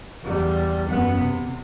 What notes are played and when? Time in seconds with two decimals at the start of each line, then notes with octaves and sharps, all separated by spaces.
0.24 E2 G3
0.89 F#2 B3
1.20 C3